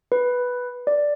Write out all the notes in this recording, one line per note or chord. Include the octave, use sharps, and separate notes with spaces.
B4
D5